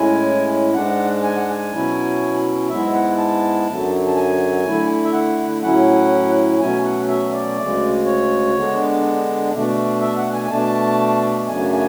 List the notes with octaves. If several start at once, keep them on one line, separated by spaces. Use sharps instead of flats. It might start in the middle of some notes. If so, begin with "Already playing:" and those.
Already playing: A2 G#3 C#4 E4 G#5
G#2 G#3 D4 F#5
G#5
F#5
G#5
B2 F#3 C#4 E4
G#2 G#3 B3 E4 E5
F#5
A5
F#2 D3 F#3
A5
G#5
D3 A3 E4
E5
F#5
A2 F#3 C#4 E4 F#5
B2 F#3 A3 C#4 G#5
F#5
E5
D5
D2 C#3 G#3
C#5
D3 G#3 B3 D4
B2 A3 D4
E5
F#5
G#5
G#5
B2 A3 D4 A5
F#2 C#3 F#3 A3 D4 G#5
G#5